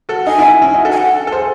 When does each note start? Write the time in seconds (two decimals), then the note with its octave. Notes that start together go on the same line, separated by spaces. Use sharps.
0.09 F#4 A4
0.27 D#4 F#4 G#5
0.38 C#4 E4
0.62 C#4 E4
0.74 D#4 F#4
0.85 F#4 A4
0.92 G#5
0.97 F#5
1.27 A4
1.32 G#4 C5